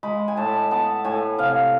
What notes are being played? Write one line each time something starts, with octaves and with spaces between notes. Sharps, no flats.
G#3 B5
G#5
A2 A5
B3 A5
A2 G#5
C3 F5